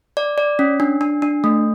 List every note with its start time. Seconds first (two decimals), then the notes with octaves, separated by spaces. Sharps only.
0.17 D5
0.38 D5
0.59 C#4
0.80 D4
1.01 D4
1.22 D4
1.44 A3